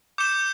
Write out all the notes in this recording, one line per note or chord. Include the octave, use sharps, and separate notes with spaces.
D6 G6 C#7 E7 G7